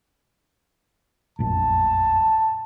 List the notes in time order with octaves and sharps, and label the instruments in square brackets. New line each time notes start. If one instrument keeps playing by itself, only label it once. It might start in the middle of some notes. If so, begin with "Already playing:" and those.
[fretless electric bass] F1 A#1 F#2 [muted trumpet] A5